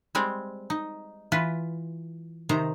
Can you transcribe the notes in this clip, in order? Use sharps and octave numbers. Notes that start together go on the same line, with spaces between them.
G3 G#3 C4 G5
D#4
E3 F4 B4
C3 D#3 D#4 C5 A#5